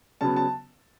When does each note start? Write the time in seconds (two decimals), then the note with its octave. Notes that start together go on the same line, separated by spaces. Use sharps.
0.21 C#3 F#3 B3 A5
0.36 A5